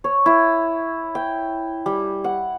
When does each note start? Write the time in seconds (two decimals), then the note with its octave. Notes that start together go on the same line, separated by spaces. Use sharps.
0.04 C#5
0.26 E4
1.15 G5
1.86 G3
2.24 F#5